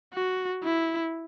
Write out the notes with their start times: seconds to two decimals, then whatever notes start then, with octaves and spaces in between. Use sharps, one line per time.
0.14 F#4
0.63 E4